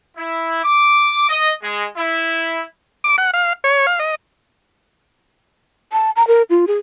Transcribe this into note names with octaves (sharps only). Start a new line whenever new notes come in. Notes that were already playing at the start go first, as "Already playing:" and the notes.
E4
D6
D#5
G#3
E4
D6
F#5
F5
C#5
F5
D#5
A5
A#5
A#4
F4
G#4